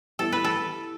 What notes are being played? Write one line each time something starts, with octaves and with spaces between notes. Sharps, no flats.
E3 G3 B3 E4 A4
B4
A4